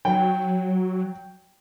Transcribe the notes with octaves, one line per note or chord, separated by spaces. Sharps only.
F#3 G5